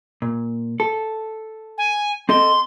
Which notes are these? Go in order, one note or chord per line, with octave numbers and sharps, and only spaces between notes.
A#2
A4
G#5
C4 A4 D#5 C6